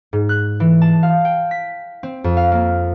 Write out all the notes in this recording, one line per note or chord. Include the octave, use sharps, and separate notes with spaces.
G#2
F#6
E3
A5
F5
G5
B6
C4
F2
F5
A#3